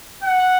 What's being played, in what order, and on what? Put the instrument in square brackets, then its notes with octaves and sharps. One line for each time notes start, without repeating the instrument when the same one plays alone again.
[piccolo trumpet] F#5